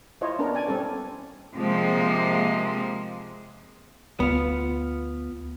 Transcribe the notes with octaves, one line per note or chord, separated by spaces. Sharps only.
E4 F4 C5 C#5 D#5
B3 C#4 D4 A#4
D5 G#5
G3 C4 C#4 A4
C3 F3 G#3 A#3
D2 B3 F4